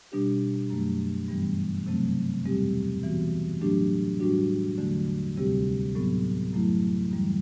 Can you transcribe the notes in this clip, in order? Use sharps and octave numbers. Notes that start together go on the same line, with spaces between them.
B2 G3 D4 G4
F#2 F#3 A3
G2 E3 G3 B3
C3 F#3 A3 C4
E2 B2 G3 C4 G4
E3 B3 F#4
A2 F#3 A3 D4 G4
A2 G3 D4 F#4
E2 D3 F#3 A3 D4
D2 C3 G3 C4 G4
A2 F#3 B3
F#2 F#3 A3 E4
F#2 E3 G3